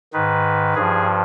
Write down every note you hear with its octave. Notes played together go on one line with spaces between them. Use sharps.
G#2 D#3 B4
G2 F3 G#4